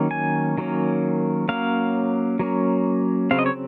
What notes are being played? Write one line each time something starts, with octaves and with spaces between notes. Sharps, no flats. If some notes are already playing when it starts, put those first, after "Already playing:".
Already playing: D#3 F#3 A#3 C#4
G#5
D#3 F#3 A#3 C#4
F#3 A#3 C#4 F5
F#3 A#3 C#4
C#3 F#3 C4 F5
D#5
C#5